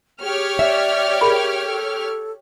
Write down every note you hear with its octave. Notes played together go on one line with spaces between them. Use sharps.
G4 G#4 C#5 F6
D5 E5
G#4 A#4 B5
A4